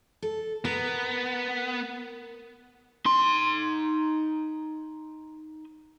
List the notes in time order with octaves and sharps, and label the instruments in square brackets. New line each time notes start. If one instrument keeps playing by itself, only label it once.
[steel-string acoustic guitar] A4
[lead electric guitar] B3 [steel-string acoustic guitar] A#4
[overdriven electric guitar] D#4 C6